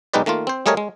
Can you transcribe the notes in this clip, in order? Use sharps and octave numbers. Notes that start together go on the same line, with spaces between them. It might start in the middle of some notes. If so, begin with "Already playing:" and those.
B1 G#3 D#4 G4 B4 D5
D#3 A3 A#3 F4
C4 C5
G3 A3 G#4 A#4 C#5 D#5
G#3